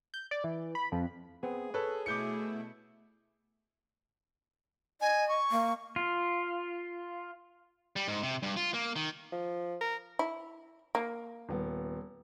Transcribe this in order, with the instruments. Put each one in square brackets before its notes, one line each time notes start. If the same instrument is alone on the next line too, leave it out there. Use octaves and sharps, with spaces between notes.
[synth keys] G6
D5
E3
B5
F2
[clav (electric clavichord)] B3 C4 [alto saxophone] G#4
[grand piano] A4 B4 [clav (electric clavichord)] C#5
[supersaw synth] B2 A3 E4 [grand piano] D6 G6 C#7
[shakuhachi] D#5 [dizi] G#5
[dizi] C#6
[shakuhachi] A#3
[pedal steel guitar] F4
[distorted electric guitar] G3
G#2
C3
G2
F4
A#3
D#3
[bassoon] F3
[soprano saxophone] A#4
[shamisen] E4
A#3
[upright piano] D#1 B3